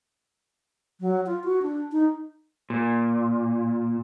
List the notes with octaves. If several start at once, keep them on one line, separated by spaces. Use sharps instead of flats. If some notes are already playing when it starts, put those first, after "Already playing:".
F#3
F4
F#4
D4
D#4
A#2